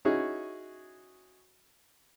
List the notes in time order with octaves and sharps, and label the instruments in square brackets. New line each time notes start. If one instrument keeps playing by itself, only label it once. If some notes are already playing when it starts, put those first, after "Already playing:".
[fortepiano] C#4 D#4 E4 F#4 G#4